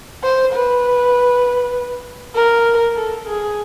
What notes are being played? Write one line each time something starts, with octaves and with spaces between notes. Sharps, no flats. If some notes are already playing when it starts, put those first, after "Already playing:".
C5
B4
A#4
A4
G#4